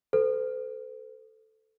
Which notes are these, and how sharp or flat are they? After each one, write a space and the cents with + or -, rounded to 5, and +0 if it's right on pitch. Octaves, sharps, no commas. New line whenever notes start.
A4 +0 C5 -45